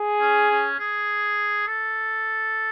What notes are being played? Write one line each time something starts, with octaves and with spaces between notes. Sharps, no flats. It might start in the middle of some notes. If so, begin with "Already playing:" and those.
Already playing: G#4
C#4
C#4
G#4
A4